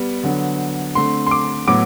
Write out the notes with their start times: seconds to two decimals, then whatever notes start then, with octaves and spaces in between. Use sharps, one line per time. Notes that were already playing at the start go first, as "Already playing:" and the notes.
Already playing: G3 B3
0.23 D3 F#3 B3
0.95 D3 A3 C4 C6
1.27 C6
1.31 D6
1.68 A2 F#3 B3 D6